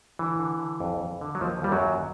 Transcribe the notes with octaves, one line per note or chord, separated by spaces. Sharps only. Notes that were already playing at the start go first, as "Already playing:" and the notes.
D3 E3
D3
D3
F2
F2
D3
F#3
D#2 F3
D#2 G3
F#2 F#3
D#2